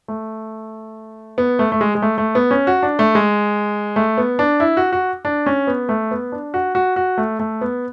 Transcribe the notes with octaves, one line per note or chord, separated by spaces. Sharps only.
A3
B3
A3
A3
G#3
G#3
A3
A3
B3
C#4
F#4
D4
A3
G#3
A3
B3
D4
E4
F#4
F#4
D4
C#4
B3
A3
B3
D4
F#4
F#4
F#4
A3
A3
B3